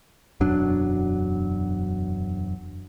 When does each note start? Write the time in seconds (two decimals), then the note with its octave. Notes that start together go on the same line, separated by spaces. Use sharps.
0.40 E1 F#2 F#3 D4